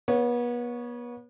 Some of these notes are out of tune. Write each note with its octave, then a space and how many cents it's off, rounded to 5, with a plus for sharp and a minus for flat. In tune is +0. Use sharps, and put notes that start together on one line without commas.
B3 -35 C#5 +0